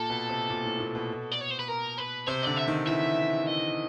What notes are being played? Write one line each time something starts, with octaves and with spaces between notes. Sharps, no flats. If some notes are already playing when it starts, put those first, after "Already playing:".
Already playing: A#2 A4
B2
C3
A#2
A2
A#2
B2
D5
C#5
C5
B4
A#4
B4
C3 C5
D3 D5
E5
D#3
E3 E5
D#5